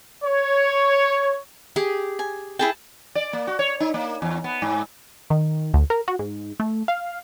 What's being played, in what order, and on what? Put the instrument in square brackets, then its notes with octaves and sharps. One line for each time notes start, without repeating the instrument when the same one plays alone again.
[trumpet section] C#5
[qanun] G4 G#4
[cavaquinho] G#5
[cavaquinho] E4 G#4 G5 [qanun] A5
[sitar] D5
A#3
F#4
C#5
D#4
A#3
E2
B3
G#2
[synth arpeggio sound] D#3
D2
A#4
F#4
G#2
A3
F5